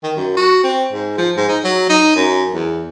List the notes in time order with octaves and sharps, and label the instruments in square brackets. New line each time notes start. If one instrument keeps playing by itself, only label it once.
[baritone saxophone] D#3
F#2
F#4
C4
G#2
F3
G#2
D#4
F#3
D#4
F#2
E2